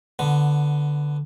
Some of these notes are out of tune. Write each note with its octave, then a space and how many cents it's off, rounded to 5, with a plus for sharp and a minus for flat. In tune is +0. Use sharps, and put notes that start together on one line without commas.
D3 +0 B3 +0